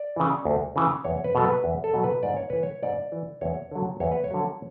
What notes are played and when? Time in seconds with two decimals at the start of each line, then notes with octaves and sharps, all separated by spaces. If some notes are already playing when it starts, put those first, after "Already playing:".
Already playing: D5
0.16 C#3 E3
0.45 D2
0.76 C#3 E3
1.04 E2 C#5
1.24 B4
1.35 B2 F#3 A4
1.45 B4
1.64 E2
1.84 A4
1.94 B2 F#3
2.04 B4
2.23 G#2 D5
2.37 C#5
2.50 E3 B4
2.63 C#5
2.82 G#2 D5
3.12 E3
3.41 E2 C#5
3.71 D3 F#3
4.00 E2 C#5
4.12 B4
4.24 C#5
4.31 D3 F#3